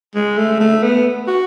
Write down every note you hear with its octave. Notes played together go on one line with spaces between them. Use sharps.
G#3
A3
A3
B3
F#4